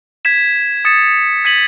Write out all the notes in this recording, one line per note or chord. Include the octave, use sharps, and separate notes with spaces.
G#6 B6 E7
D#6 A6 C#7 E7
G#6 B6 D#7 F#7